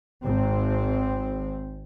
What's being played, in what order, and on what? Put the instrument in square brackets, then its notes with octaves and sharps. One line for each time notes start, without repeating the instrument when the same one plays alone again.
[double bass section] G#1 C4